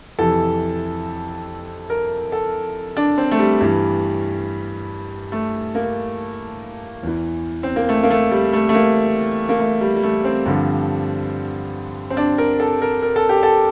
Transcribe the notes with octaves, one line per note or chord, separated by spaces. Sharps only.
F2 C3 E3 A4
A#4
A4
D4
C4
A3
G3
G2 E3
A3
A#3
E2 E3
C4
A#3
A3
A#3
A3
G3
A3
A3
A#3
A#3
A3
G3
G3
A3
C4
G2 D3 F3
C4
D4
A#4
A4
A#4
A#4
A4
G4
A4